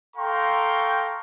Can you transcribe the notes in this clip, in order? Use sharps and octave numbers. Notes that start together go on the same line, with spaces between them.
A4 F5 G5 A#5 C6 C#6